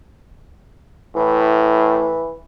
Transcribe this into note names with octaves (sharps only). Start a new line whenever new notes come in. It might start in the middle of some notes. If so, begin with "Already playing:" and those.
A2 E3